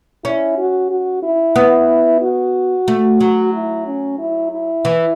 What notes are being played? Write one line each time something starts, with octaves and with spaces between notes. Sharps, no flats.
C#4 E4
F#4
F#4
E4
B3
F#4
A3
F#3
E4
C#4
E4
E4
E3